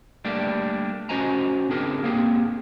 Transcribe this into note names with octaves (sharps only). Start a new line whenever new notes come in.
G3 A3 A#3 D4 G4
C#4 F#4 C5 D#5 G#5 A#5
C4 D4 G#4 A#4
A#3 C4 G4 G#4